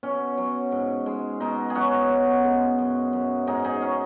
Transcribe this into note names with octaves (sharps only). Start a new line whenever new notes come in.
B2 C#4
F#3
G#2
G#3
B2 D#4
G#4
F#3 C#4 F#4
B2
G#3
F#2
F#2
G#2 D#4 G#4
D#4 G#4
C#4